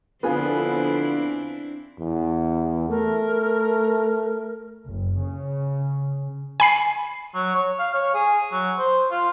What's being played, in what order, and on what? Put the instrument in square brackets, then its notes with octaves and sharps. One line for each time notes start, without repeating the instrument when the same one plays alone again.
[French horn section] D3 F3 [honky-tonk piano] B3 F4 G#4 [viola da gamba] C4 D4 E4
[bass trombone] E2
[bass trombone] A3 [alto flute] A#4
[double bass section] F#1
C#3
[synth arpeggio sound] G#5 B5 C7
[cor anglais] F#3
C#5
F5
C#5
G#4
F#3
C5
F4